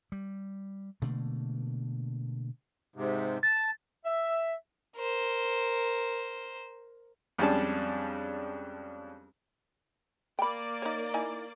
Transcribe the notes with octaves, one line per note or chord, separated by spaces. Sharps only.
G3
B2 D3 A3 A#3
G#2 C3
A5 A6
E5
A#4 C5
F2 G3 G#3 C#4 D4 A5
A#3 D5 G5 B5
D#4 C#5
D#4 E4 G#5